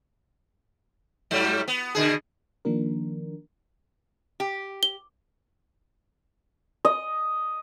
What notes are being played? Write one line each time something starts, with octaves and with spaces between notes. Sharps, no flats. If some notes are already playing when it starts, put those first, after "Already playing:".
G#2 F#3 G3
B3
B2 D3 G#4
D#3 F3 A#3 D4 A#4
G4
G7
D#5